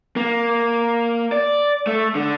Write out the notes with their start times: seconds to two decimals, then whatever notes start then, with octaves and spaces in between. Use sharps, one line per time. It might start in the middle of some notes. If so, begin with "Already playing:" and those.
0.16 A#3
1.32 D5
1.87 A3
2.15 D3